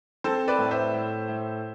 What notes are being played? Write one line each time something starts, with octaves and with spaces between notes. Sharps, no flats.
C4 A4 C5
B4 D5
A2
C5 E5
A2
A2